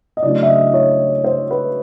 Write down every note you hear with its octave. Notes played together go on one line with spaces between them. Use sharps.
D#5
C#3 F#3 A3 D4 D5
E5
D#5
C#5
C5
B4